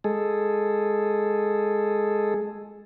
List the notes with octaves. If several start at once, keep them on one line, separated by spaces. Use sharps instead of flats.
G#3 G#4 A4